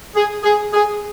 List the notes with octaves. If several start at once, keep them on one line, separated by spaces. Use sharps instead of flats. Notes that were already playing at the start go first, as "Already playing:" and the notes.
G#4
G#4
G#4